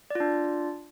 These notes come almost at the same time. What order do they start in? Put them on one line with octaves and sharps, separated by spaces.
D5 F4 D4